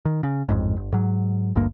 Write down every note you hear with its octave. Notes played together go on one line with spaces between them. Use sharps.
D#3
C#3
A1 F2 G#2
G1
G#2 F#3
G#1 D2 G2 A#3